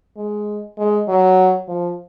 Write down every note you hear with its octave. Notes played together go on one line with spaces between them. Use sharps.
G#3
G#3
F#3
F3